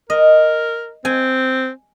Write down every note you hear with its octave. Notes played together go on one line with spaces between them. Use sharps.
A#4 D#5
C4 G#5